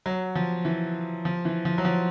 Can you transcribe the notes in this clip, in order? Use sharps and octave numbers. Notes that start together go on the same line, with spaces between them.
F#3
F3
E3
F3
E3
F3
F#3
F3